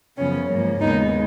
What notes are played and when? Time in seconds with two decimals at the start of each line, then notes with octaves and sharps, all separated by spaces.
0.17 F#2 C#3 F3 B3 C#4
0.48 G#2 F3 A#3
0.80 D#2 C#3 G#3 B3 D#4